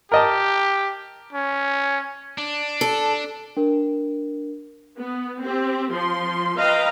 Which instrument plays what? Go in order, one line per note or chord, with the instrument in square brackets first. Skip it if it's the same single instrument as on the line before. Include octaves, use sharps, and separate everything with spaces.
[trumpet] G4 [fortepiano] A#4 D#5 A5
[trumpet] C#4
[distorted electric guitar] D4
[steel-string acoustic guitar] A4
[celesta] D4 A#4
[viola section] B3
C4 G4
F3 C6
B4 D#5 F5 G5 A#5